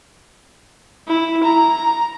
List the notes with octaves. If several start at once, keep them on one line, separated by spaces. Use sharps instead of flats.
E4
A#5